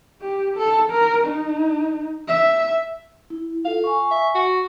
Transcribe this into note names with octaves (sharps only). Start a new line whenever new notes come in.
G4
A4
A#4
D#4
E5
E4
F4 A4 F5
G#5 C#6
E5
F#4